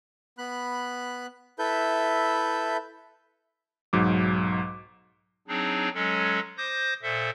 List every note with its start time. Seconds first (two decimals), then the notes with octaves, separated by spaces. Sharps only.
0.38 B3 B5 F#6
1.59 E4 A4 B4 E5 G6
3.93 B1 G#2 F#3 D6
5.48 F#3 C4 D4 D#4 G#4
5.94 F#3 G#3 C#4 A4
6.58 C5 D6 D#6 G6 A#6
7.02 A#2 A4 C5 E5